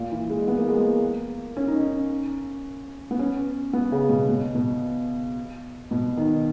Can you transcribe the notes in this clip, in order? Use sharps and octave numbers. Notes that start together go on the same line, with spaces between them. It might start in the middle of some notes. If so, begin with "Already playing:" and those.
Already playing: A#2
E3
G#3
B3
A#3
G#3
A#3
C#4
D#4
C#4
B3
C#4
B3
C#3
B2
B2
B2
B2
D#3